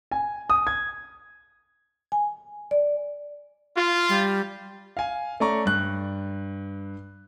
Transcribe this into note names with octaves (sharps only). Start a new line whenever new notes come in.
G#5
D#6
G#6
G#5
D5
F4
G3
F5 G#5
A3 C#4 D5 A#5 C#6
G2 F#6